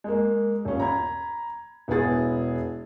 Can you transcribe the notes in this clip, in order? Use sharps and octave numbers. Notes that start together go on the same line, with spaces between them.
G#3 A#3
D#1 C#4
A#5 B5 G#6
E1 B3 E4 G#4 A6